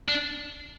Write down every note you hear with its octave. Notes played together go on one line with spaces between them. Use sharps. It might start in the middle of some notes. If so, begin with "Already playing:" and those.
D4